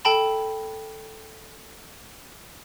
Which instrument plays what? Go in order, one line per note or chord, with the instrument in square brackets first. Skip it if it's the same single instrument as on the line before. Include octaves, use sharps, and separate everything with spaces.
[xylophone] A4 G5 A5 B5